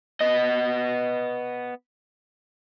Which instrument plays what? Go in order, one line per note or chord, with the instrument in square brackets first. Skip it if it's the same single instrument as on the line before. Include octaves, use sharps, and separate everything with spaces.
[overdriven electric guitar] B3 D#5